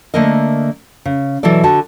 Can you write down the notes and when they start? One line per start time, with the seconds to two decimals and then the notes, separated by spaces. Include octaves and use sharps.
0.14 D3 A3 A#3 A#4 D#5
1.05 C#3
1.43 B2 E3 F#3 E4 A4 D5
1.64 D3 F#4 A5